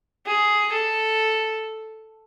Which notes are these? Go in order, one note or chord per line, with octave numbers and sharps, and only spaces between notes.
G#4
A4